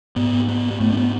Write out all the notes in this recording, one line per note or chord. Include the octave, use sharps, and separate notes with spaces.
G#2 B3
B3
B3
G#2 A3
C#4
B3